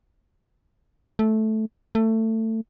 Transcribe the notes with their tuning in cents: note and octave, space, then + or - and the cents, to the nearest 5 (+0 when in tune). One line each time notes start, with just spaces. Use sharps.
A3 -10
A3 +20